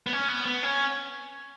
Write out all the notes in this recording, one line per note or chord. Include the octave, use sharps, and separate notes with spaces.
B3
C#4
B3
B3
C#4